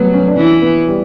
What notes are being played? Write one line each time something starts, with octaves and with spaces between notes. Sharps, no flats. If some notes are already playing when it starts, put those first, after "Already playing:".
Already playing: F#3 G3 A3 B3
C#4
D4
E3 C#4
B3
G3